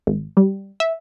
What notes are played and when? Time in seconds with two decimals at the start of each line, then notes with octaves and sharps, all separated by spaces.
0.07 G#1
0.37 G3
0.80 E5